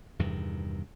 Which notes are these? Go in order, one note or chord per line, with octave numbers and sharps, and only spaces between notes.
E2 G2 C3 D#3